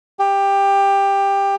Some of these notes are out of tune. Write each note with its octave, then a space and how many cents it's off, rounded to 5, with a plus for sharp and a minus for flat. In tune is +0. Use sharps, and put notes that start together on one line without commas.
G4 +15